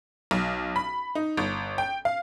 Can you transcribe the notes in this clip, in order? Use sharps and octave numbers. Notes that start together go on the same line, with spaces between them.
B1
B5
D#4
G1
G5
F5